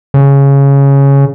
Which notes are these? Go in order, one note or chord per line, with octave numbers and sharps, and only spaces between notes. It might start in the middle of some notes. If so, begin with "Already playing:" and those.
C#3